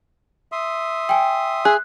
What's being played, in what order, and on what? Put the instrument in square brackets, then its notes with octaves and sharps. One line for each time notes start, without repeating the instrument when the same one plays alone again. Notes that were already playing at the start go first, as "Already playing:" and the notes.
[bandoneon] E5 C6 D#6
[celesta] G5 G#5
[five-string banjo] G#4 [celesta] F#6